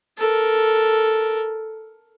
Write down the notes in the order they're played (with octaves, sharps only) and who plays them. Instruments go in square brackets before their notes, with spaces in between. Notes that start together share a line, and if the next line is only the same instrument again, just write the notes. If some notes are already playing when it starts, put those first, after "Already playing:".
[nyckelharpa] A4 A#4